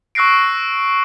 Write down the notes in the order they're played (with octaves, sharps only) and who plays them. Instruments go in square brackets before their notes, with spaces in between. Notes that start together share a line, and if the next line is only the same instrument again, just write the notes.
[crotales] C#6 E6 F#6 A#6 C7 D7